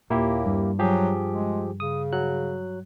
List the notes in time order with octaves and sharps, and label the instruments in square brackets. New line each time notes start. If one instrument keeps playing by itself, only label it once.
[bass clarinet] D#2 [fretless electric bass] A#2 [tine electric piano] A#3 E4 G4
[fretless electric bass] G2
[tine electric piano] F3 G4 G#4 [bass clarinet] F#3
[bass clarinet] G#3
[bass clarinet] C#3 [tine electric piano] D#6
[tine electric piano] F#3 F#6